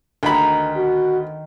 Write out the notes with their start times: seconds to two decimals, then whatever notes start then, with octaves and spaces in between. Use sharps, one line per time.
0.23 D2 D#3 B5
0.77 F#4